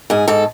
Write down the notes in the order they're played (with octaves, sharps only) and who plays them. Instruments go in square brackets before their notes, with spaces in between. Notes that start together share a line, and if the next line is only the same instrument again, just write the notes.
[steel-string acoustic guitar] G#2 G#4
G#2 A4